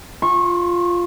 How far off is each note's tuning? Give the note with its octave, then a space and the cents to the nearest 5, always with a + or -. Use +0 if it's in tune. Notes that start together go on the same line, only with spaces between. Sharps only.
F4 +0 C#6 -25